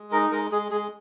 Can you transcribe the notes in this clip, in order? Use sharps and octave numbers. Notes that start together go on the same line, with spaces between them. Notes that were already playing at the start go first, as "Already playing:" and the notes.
Already playing: G#3
D#4 A#4
G#3 A#4
G#3 G#4
G#3 G#4